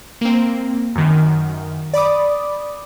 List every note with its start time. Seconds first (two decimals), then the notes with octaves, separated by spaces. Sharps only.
0.21 A#3 C4
0.96 F#2 D#3
1.94 D5 B5 D6 D#6